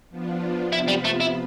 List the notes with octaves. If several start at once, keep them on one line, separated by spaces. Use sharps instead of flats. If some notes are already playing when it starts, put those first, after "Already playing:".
F3 B3 D4 F4
C3 F3 B3 E4 F4 B4
G3
A3
E4